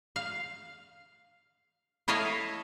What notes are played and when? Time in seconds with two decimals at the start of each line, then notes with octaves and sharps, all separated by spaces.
0.16 F5
2.08 E4 A4 C#5 D#5 F5